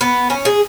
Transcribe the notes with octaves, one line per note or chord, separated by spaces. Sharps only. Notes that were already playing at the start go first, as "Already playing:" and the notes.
B3
C#4
G#4